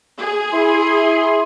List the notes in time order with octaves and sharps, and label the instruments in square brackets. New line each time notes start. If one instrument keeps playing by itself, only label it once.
[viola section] G#4
[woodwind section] E4 C6